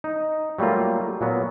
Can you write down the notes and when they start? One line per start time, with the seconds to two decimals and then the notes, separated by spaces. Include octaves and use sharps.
0.04 D#4
0.58 F#3 G3 A3 A#3 F4
1.21 A#2 F#3 B3